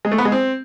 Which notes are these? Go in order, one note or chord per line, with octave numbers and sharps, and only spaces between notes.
G#3
A3
B3
G#3
C4